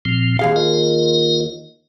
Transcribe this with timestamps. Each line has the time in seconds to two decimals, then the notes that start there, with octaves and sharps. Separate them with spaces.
0.05 A#2 F3 C4
0.39 D#2 G#4 F5
0.56 F4 A#4 D#5